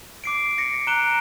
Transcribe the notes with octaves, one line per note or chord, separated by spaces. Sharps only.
D6 C7 D7
A#6 C#7
A#5 F#6 D7 E7 G7